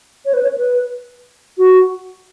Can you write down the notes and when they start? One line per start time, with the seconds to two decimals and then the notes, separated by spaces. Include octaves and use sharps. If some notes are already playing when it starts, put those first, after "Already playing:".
0.25 C#5
0.34 B4
0.43 C#5
0.58 B4
1.58 F#4